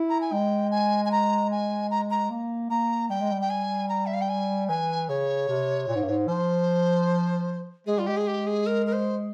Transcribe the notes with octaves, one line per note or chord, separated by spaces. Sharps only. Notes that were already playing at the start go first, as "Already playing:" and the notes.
Already playing: E4
A#5
G#5
G#3 G5
G#5
G#5
A#5
G#5
A#5
A#5
A#3
A#3 A#5
G3 G5
G#3
G3
G5
G#5
A#5
E5
F5
G5
G#5
E3 G#5
C#3 C#5
C3
A#2
G#2
G2
G#2
F3 C5
G#3 G#4
G3 F4
G#3 G4
G#4
G4
G#4
A#4
A#4
C5